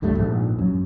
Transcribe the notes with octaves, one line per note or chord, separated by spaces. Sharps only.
C#2 G2 G3 A3
A#1 G#2
F#2